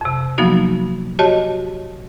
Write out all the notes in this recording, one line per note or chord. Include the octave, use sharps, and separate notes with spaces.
F2 C3
F3 F#3 A#3 B3 D#4 F#4
F#4 G4 C#5 D#5 A5